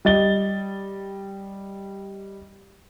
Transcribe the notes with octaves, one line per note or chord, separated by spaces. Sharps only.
G3 D#5 A6 G7